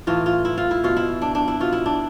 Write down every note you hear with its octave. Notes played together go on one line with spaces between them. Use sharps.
A2 E3 F4
F4
E4
F4
E4
B2 F4
E4
D4
D4
E4
B2 F4
E4
D4